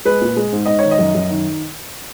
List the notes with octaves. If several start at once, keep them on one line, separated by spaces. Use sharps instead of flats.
G#3 B4
A#2
G#3
G#2
G#2 D#5
C#5
D#3
D#5
F#2
F#2
D#3